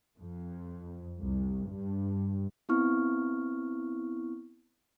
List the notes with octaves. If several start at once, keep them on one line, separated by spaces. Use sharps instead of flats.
F2
C2
G2
B3 C4 E4 C#6 F6